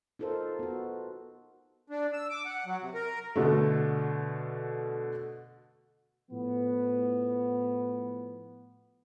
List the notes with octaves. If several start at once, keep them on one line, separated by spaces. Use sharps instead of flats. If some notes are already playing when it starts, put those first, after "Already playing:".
D#4 F4 A4 A#4 C5
B3 F#4
D4
E6
D6
F#5
F#3
C3
A#4
B2 D3 A3
A2 F3 B3